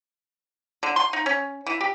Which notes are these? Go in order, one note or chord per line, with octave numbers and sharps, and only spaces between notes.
D3
C6
D#4
C#4
E3
G4